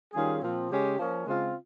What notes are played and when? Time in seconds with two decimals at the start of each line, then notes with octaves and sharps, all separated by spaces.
0.14 D#3 G3 C#4 F4 G#4
0.42 A#2 F3 C4
0.71 C#3 G#3 C#4 G4
0.99 F3 A#3 C#4
1.26 C#3 G#3 C4 F4